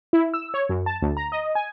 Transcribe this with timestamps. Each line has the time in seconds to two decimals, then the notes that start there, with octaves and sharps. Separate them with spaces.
0.13 E4
0.34 E6
0.54 C#5
0.69 F#2
0.86 A5
1.02 D2
1.17 A#5
1.32 D#5
1.55 G#5